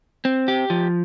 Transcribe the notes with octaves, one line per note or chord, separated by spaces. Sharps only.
C4
G4
F3